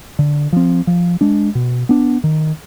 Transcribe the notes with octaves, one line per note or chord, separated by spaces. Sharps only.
D3
F3 C4
F3
G#3 D4
B2
B3 D4
D#3